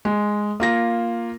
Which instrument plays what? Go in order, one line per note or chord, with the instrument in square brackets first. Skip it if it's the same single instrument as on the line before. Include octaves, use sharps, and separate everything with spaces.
[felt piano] G#3
A#3 F4 A#6